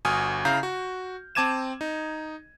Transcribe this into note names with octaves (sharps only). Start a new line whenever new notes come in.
G1 F#4 G#5 D#6 F6
C#3 E4 F5 A#5 G6
F#4
C4 A5 D6 G#6 D#7 E7
D#4